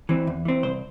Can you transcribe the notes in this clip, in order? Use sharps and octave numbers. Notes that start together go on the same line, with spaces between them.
E3 C4
E2
E3 C4
C2 C5